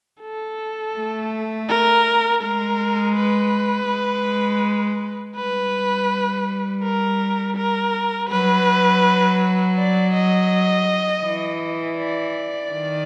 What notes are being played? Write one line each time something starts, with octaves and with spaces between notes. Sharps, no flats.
A4
A3
A#4
G#3 A#4
B4
G#3
G3 B4
A#4
A#4
F#3 B4
D5
D#5
E3
D5
D#3